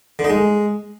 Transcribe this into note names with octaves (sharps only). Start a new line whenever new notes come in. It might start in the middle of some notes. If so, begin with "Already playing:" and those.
D3
D#4
G#3